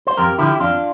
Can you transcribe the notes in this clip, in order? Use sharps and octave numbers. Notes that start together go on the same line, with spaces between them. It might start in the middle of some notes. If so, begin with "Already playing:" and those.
C5
F2 G4 A#4
D3 F3 E4 G4
F2 D4 F4